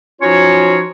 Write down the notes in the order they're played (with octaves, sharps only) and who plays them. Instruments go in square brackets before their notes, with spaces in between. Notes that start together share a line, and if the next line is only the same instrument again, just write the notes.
[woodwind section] F3 C#4 D#4 F4 F#4 C#5